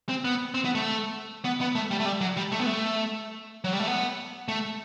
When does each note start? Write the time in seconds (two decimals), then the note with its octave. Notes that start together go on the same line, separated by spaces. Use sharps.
0.09 C4
0.25 B3
0.54 C4
0.65 B3
0.75 A3
1.45 B3
1.61 B3
1.75 A3
1.91 G3
2.00 A3
2.06 G3
2.21 F#3
2.37 G3
2.52 A3
2.60 B3
2.66 A3
3.64 F#3
3.73 G3
3.79 A3
3.87 B3
4.48 A3